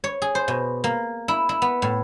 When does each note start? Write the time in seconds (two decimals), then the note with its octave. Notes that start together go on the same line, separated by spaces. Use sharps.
0.04 C#5
0.22 G#4
0.35 C5
0.48 B2
0.84 A#3
1.28 E4
1.49 E4
1.62 B3
1.82 A2